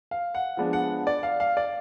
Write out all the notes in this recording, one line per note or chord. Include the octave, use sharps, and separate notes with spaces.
F5
F#5
F3 G#3 B3 D4
F#5
D5
F5
F5
D5